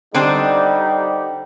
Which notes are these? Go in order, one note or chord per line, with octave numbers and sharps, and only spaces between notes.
D3 G3 C4 D4 D#4 G4